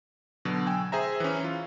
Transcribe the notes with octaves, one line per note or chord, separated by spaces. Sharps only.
B2 D3 F#3
G5 G#5 E6
G#4 C5 E5 A#5
E3 C#4
F4